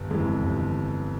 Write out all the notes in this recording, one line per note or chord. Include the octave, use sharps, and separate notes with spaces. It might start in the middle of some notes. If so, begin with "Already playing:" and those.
Already playing: G1
F2 E3 G#3
G1